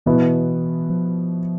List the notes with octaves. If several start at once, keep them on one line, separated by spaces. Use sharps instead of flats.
B2 E3 B3 E4
F3
E3
F3